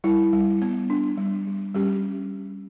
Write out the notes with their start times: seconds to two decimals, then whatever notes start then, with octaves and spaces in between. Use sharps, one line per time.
0.04 G3 E4
0.33 G3
0.62 B3
0.90 D4
1.18 G3
1.47 G3
1.75 G3 C#4 G4